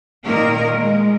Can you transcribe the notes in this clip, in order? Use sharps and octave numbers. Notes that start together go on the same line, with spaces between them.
A#2 D#3 A#3 A#4
G#3